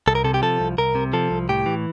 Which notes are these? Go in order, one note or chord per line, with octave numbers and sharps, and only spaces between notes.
C2 A4
A#4
C3 A4
G4
F3 A4
C2
C2 A#4
C3
F3 A4
C2
A2 G4
E3